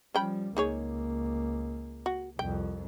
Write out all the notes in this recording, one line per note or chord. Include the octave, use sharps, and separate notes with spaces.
F3 G3 C#4 G5 B5
C#2 A#3 D#4 G#4 C#5
F#4
C2 F2 G5